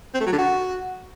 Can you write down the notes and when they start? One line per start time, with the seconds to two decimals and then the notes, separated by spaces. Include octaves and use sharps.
0.14 C4
0.20 A3
0.26 F#3
0.32 D3
0.38 F#4